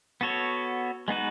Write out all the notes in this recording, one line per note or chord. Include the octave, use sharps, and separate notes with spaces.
B3 F#4 A4 C#5
G#3 B3 D#4 F#4 B4